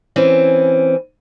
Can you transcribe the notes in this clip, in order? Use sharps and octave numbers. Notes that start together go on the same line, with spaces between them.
E3 C4 C#4